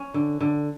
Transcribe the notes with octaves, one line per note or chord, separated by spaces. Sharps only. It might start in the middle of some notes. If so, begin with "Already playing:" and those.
Already playing: C#4
D3
D3